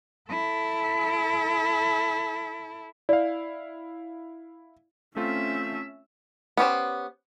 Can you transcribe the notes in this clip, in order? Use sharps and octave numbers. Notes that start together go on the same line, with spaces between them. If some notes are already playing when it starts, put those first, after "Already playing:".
E4 A4
E4 D5 F5
A3 C4 C#4 F4 E5
B3 C#4 G4 C5